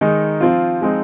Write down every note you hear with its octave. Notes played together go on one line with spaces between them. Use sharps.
D#3 G#3 D#4
F3 C4 F4
F3 G#3 C4 D#4